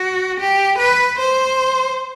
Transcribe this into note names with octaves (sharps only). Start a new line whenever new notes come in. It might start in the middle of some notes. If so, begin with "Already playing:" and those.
Already playing: F#4
G4
B4
C5